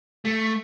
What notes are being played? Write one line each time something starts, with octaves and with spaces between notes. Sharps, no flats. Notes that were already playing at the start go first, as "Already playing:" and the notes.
A3